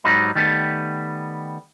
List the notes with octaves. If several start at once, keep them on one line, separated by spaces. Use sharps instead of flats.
G#2 F#3 G3 D#4 B5
D#3 G3 A3 B3